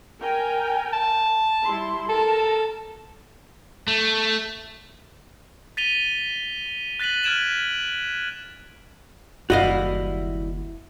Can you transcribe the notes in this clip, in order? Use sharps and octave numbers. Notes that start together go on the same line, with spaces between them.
A#4 G5 G#5
A5
G3 E4 C6
A4 A#4 A5
A3
A6 B6 D#7 F7 G7
F#6 A6 B6 D#7 F#7
F6 F#6 G#6 D7 E7 F#7
F#1 D#2 G3 E4 F#4 D#5 F5